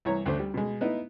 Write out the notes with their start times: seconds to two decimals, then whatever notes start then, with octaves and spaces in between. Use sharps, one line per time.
0.05 C2 E3 C#5 A#5
0.26 D2 A3 D4 C5
0.39 G3
0.54 B2 G#3
0.81 B3 D#4 E4